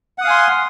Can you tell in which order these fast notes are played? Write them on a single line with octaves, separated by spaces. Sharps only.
F#5 D#6 F5 G#5 C6